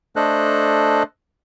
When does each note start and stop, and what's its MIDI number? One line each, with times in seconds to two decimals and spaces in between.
0.16 1.03 57
0.16 1.03 62
0.16 1.03 69
0.16 1.03 72
0.16 1.03 75
0.16 1.03 90